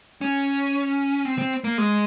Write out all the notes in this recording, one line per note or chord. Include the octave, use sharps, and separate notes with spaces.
C#4
C4
C4
A#3
G#3